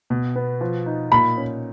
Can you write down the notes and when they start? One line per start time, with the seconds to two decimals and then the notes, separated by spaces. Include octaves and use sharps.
0.10 B2
0.36 B3
0.61 F3
0.86 D#4
1.11 A#2 B5
1.37 C#4